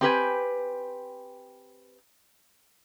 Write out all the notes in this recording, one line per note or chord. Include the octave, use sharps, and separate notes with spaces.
C4 G4 B4 G#5